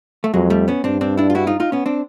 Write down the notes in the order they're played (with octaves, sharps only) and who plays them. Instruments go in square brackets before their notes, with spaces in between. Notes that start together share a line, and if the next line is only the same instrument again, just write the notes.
[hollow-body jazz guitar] A3
[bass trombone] F2 [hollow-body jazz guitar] F#3 G#3
[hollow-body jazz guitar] G3 A3
B3 C#4
[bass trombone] G2 [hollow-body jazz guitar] C4 D4
[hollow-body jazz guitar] C4 D4
D4 E4
F4
E4 F#4
D#4 F4
D#4 F4
B3 C#4
C4 D4